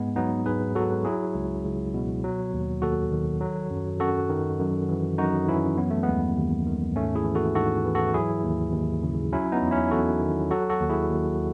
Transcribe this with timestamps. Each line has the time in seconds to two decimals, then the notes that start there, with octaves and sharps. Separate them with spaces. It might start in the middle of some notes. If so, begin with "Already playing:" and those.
Already playing: G#2 G#3 B3
0.16 F#3 B3 D#4
0.45 G#2 G#4 B4
0.75 F#3 F#4 A4
1.05 F#3 E4 G#4
1.35 C#2
1.64 C#2
1.94 B2
2.24 F#3
2.53 D#2
2.82 D#2 F#4 A4
3.12 D#3
3.41 F#3
3.71 F#2
4.00 F#2 F#4 A4
4.30 D#3
4.59 F#2
4.89 E3
5.18 F#2 D#4 F#4
5.48 E3 C#4 E4
5.77 F#3 B3
5.90 A3
6.03 D#2 G#3 B3
6.37 D#2
6.67 D#3
6.95 G#2 A3 C#4
7.15 E4 G#4
7.25 E3
7.35 F#4 A4
7.55 G#2 F#4 A4
7.85 E3
7.95 F#4 A4
8.14 F#3 E4 G#4
8.43 D#2
8.73 D#2
9.03 C#3
9.32 F#3 C#4 E4
9.52 B3 D#4
9.62 E2
9.71 C#4 E4
9.91 E2 F#4 A4
10.22 D#3
10.51 F#3 F#4 A4
10.70 F#4 A4
10.80 D#2
10.90 E4 G#4
11.10 D#2